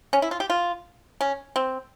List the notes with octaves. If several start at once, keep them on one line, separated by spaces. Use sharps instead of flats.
C#4
E4
F4
G4
F4
C#4
C4